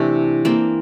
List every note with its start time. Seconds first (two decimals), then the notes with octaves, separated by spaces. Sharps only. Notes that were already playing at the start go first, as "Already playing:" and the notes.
Already playing: C3 E3 A3 D4 E4
0.45 E3 A#3 C4